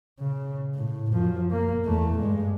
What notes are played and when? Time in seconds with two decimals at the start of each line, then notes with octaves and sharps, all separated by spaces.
0.20 C#3
0.75 A2
1.11 F#2 F3
1.52 A#3
1.85 E2 A3
2.18 G2 G#3